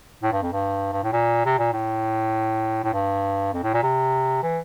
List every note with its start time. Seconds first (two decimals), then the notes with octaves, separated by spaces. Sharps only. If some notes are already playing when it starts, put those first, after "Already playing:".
0.23 A2
0.32 G2
0.42 F2
0.52 G2
0.93 G2
1.03 A2
1.12 A#2
1.45 C3
1.59 A#2
1.73 A2
2.84 A2
2.93 G2
3.53 F2
3.63 A2
3.73 A#2
3.83 C3
4.43 E3